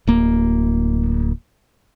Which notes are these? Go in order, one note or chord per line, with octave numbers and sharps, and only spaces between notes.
D1 A#3